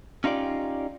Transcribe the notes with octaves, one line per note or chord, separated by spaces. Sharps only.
C#4 D#4 F4 G4 D5